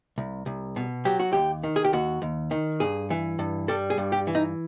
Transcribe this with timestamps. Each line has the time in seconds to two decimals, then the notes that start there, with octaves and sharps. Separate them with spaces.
0.18 C2
0.46 C2
0.76 B2
1.05 F#3 G4
1.20 F#4
1.33 D#2 G4
1.63 D#3
1.76 G#4
1.84 G4
1.93 D#2 F#4
2.22 D#2
2.51 D#3
2.80 G2 G#4
3.10 E3
3.39 G2
3.68 G3 A4
3.90 G#4
3.98 G2
4.12 G4
4.27 E3
4.35 D#4